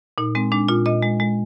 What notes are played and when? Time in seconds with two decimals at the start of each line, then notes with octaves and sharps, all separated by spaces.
0.18 A#2 D#4
0.35 G#3 C4
0.52 G#3 D4
0.68 A#2 F4
0.86 A#2 D#5
1.03 G#3
1.20 G#3